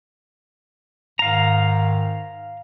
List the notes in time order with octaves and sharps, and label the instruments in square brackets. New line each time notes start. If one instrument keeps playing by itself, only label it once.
[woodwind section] G#2 D#3 [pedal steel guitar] F5 A#5